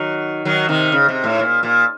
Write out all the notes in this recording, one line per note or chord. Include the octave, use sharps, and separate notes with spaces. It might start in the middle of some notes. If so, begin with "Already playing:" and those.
Already playing: D#3 F#3
D#3 F#3
C3 D#3
C#3
C3
A2
A#2
A#2